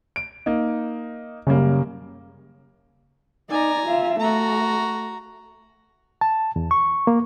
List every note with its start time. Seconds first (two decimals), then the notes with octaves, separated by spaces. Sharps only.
0.16 D7
0.46 A#3 D#4
1.47 F#2 C#3 G3 A#3
3.49 D#4 D5 G#5 A#5
3.86 F4 E5
4.20 A3 F#4 A#5
6.21 A5
6.56 E2
6.71 C#6
7.07 A#3